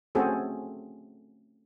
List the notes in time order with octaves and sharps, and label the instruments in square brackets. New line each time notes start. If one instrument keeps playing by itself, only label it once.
[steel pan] A3 C4 C#4 F#4 G#4 A4